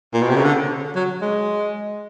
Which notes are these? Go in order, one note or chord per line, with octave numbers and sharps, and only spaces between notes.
A#2
B2
C3
C#3
D3
F#3
G#3